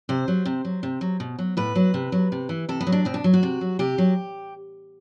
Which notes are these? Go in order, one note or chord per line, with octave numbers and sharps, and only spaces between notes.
C3 C5
F#3
C3
F#3
C3
F#3
B2
F#3
A2 B4
F#3
C3
F#3
C3
E3
C3 A4
B3
F#3
D4
B2 C4
D4
F#3
F#4
C3
F#3
C3 G4
F#3